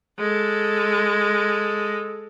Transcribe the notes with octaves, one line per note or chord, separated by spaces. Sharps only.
G#3 A4